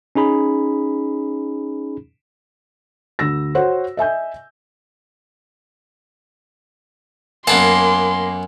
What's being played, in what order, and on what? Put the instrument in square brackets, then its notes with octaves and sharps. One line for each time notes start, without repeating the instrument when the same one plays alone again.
[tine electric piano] C#4 D#4 G#4 B5
[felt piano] D2 E6 A#6
F#4 C5 C#5 F#5
D#5 E5 G#5 G6
[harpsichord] F#2 B3 A5 [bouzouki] A#3 [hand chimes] G#5 [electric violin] C6